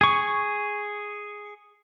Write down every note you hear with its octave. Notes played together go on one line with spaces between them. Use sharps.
G#4 C#6